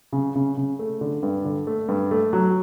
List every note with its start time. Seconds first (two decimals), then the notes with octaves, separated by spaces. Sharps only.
0.13 C#3
0.35 C#3
0.57 C#3
0.79 A3
1.01 D3
1.23 G2
1.45 D3
1.67 A3
1.88 G2
2.11 A3
2.33 F#3